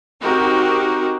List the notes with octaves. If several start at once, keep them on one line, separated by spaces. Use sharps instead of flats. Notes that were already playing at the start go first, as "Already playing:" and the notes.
C4 D#4 F#4 G4 A#4